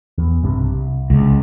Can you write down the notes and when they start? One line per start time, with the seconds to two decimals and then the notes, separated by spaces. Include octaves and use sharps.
0.18 E2
0.43 B1 G2 C3
0.75 C2
1.10 C#2